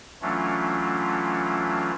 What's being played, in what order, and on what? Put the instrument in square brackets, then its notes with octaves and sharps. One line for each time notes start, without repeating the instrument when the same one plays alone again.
[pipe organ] E3 F#3 A3 C#4 D4 F4